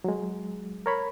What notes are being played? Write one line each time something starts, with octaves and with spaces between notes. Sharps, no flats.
F#3 G#3
A#4 C#5 B5